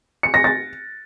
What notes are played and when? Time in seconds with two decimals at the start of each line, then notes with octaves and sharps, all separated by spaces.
0.23 C#7
0.34 A#6
0.44 A6